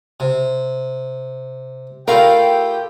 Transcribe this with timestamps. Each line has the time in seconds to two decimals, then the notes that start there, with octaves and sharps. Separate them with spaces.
0.20 C3
2.08 A3 E4 F4 G4 A#4 F5 G5